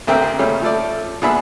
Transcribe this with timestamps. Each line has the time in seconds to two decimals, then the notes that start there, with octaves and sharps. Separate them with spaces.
0.07 A1 D3 C4 A#4 E5 G5
0.39 A#2 C#3 G3 A3 C#4
0.62 F3 A3 A4 D5
1.22 A#2 B3 D4 G#4 E5 B5